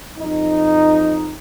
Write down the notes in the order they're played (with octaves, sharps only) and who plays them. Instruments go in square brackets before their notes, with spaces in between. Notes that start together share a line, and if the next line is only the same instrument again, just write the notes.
[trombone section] F2 D#4